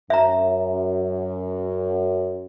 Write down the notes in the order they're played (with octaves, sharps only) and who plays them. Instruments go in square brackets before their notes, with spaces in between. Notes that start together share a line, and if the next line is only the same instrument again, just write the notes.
[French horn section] F#2 [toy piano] E5 A#5